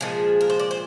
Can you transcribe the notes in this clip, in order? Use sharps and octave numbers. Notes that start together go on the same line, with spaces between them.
A#2 F3 G#3 G#4
A#4
C5
D5
C5